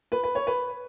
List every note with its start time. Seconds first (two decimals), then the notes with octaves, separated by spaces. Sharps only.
0.12 B4
0.23 B4
0.35 C#5
0.47 B4